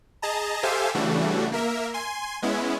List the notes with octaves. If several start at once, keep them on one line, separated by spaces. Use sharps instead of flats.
G#4 D#5 A5 A#5
G4 A4 C5 E5 F5 G#5
C#3 E3 G3 A3 D4 F#4
A#3 A#4 E5
G#5 C6
G#3 B3 C#4 E4